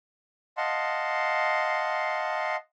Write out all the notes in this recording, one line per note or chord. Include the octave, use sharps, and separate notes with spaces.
D#5 F5 F#5 A5 C6